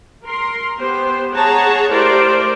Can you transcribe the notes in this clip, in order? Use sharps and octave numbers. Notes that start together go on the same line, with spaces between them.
A#4 C6
B3 G4 C5
G#4 C#5 F#5 A5 A#5
A3 E4 G4 A#4 C5 D5